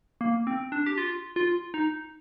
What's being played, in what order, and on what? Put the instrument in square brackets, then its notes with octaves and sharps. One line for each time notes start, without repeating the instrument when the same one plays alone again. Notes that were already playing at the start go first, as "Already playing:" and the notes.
[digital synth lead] A#3
C4
D4
G4
F4
F4
D#4